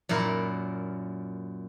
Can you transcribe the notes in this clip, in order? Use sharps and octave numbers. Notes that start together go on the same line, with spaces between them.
F#2 A#2 E4 A#4